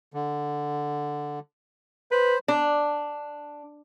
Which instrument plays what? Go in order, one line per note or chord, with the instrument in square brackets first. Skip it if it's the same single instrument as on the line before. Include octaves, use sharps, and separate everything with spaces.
[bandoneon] D3
[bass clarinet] B4 [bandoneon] C5
[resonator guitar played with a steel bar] D4